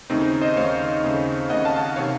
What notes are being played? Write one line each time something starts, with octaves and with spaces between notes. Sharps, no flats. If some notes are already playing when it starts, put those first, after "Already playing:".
D#2 C#3 A3 C4 D#4
C5 D#5
D#2 C#3 A3 C#5 F5
D#2 C#3 A3
D#2 C#3 A3 D#5 F#5
F5 A5
A5
D#5 F#5
C3 D#3 C#5 F5